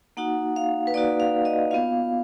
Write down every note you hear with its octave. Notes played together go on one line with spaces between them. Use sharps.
A#3 D#4 F#4 F#5
F5
B4
A#3 D#4 F#4 D5
F5
D#5
B3 F4 F5